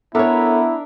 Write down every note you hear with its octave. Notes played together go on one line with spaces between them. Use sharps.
B3 D4 E4 A4 A#4 C#5 E5